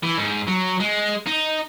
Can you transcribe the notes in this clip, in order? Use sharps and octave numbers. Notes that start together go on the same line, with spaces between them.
E3
G#2
F#3
G#3
D#4